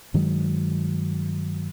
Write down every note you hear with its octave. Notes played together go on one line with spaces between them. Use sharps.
G2 D#3 F#3 G#3